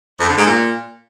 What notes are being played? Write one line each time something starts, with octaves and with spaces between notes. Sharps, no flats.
F2
D3
G#2
A#2